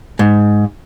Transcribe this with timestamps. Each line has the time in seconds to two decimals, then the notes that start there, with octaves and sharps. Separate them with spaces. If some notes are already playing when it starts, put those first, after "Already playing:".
0.19 G#2